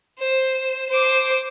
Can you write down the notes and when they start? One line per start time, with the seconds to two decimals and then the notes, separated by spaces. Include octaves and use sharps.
0.18 C5
0.89 C5 D6